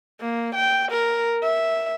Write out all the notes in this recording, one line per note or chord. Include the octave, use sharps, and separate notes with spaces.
A#3
G5
A#4
E5